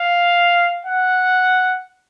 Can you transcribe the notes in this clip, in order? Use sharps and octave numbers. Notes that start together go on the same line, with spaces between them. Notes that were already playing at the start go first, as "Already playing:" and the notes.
Already playing: F5
F#5